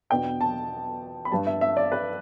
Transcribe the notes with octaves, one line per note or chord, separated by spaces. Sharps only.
E2 B2 B3 D4 G5
A5
B5
G2 G3 D4 A5
E5
E5
D5
B4